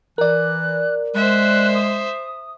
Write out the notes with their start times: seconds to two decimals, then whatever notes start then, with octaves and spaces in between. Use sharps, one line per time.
0.18 E3 A#4 D5 F#6
1.15 G#3 C5 E5 F#6
1.75 D#6